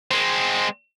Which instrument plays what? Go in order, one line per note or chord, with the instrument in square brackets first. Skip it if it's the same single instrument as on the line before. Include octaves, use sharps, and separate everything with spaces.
[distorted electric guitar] G#3 C4